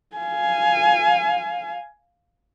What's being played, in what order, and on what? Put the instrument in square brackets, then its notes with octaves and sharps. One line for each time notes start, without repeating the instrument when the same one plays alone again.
[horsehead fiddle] F5 G#5